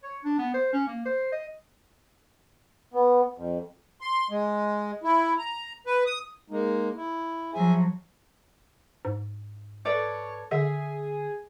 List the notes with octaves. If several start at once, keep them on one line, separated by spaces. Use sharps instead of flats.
C#5
D4
B3
C5
C#4
A#3
C5
D#5
B3
F2
C6
G#3
E4
A#5
B4
D#6
G#3 A#3 D#4
E4
F3 F#3 G#4 E5 G#5
G#2
A4 B4 C#5 D5
D3 G#4 E5